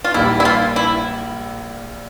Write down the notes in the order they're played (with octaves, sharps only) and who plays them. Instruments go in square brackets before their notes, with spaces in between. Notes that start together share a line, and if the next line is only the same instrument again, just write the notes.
[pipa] F4
[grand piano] A#1 A#2 G3 A#3 [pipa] E4
[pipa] E4
F4
E4